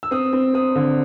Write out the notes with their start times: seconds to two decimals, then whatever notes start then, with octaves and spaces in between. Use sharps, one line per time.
0.03 E6
0.11 C4 D#6
0.33 C4
0.54 C4 D#6
0.76 D3